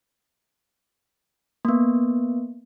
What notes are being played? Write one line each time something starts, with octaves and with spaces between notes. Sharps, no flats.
A#3 B3